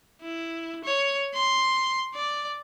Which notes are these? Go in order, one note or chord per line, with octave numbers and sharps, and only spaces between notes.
E4
C#5
C6
D5